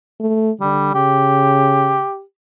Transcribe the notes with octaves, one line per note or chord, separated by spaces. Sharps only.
A3
D3 G3
C#3 G4